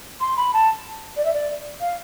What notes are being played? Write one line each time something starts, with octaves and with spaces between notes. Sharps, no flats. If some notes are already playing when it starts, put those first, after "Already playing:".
C6
B5
A5
D5
E5
D5
F5